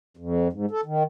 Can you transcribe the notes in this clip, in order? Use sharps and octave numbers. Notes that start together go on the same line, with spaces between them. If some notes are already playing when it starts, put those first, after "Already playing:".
F2
G#2
A4
D#3